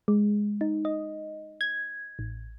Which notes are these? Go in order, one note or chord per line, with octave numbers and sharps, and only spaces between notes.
G#3
D#4
D#5
G#6
A1